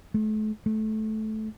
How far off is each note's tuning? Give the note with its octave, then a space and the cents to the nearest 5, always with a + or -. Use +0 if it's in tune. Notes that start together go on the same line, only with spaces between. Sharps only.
A3 -40
A3 -20